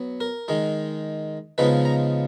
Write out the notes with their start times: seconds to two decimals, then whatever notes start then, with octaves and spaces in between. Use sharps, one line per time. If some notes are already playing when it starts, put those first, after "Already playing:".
Already playing: F#3 B3
0.20 A#4
0.48 D#3 G#3 D#4
1.58 C#3 F3 G#3 B3 D#4 B4
1.85 A#5